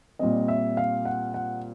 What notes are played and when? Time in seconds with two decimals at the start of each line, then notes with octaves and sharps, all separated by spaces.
0.19 A#2 G3 C4 D#5
0.48 E5
0.77 F5
1.05 F#5
1.34 F#5